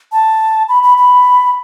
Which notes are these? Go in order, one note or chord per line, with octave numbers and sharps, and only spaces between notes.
A5
B5
B5
B5